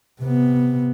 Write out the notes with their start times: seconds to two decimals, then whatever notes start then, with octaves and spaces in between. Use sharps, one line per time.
0.21 C3 B3